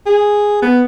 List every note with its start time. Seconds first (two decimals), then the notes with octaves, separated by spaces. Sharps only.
0.06 G#4
0.62 B3